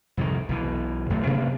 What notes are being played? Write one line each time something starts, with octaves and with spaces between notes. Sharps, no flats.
C2 F2 G#2 D#3
B1 B2 E3
E2 A2 F#3 A3
C3 A#3 B3 D4